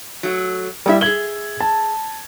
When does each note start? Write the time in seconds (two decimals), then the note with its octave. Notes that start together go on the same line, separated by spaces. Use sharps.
0.23 F#3 A3
0.86 A#2 G3 E4 A4 E5
1.01 G#4 E5 G#6 F#7 G7
1.60 A5